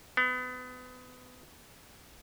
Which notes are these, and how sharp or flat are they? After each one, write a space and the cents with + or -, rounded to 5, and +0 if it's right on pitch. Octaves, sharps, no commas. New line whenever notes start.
B3 +30